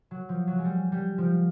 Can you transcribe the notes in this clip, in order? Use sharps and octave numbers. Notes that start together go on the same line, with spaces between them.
F#3
F3
F#3
G#3
G3
G3
F3